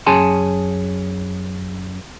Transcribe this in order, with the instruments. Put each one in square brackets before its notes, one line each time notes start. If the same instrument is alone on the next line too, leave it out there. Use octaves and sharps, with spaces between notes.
[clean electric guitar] F#2 C#4 G#4 G#5 A5 C6